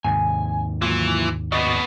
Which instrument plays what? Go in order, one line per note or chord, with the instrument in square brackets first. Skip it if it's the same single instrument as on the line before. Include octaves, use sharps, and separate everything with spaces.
[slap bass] D#2 G#2 C3 [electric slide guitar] G#5
[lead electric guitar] E3 [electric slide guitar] F#3 A#3 F4
[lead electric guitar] C#3 B3 [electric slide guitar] F#4 D5 D#5